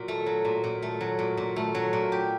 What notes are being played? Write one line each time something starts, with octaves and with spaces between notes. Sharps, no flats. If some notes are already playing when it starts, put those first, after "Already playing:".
Already playing: A#2 F#3
A3
F#3
A#2
A#2
A3
F#3
A#2
A#2
A3
F#3
A#2
G4